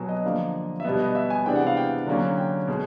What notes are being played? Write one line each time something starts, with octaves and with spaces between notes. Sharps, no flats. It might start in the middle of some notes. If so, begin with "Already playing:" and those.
Already playing: B2 F#3 B3 G#5
D#5
D3 F3 A#3
E5
B2 G3 B3 D#5
D#5
E5
G#5
C3 E3 G#3 B3 D4 G5
F#5
F5
G5
D3 F#3 A#3 C#4
G5
B2 G#3